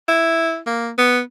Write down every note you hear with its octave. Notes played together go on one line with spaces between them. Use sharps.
E4
A#3
B3